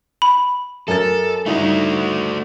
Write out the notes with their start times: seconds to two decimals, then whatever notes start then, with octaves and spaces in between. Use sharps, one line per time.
0.22 B5
0.88 F#2 A4 A#4 A6
1.46 G2 A3 D#4 E4 F#4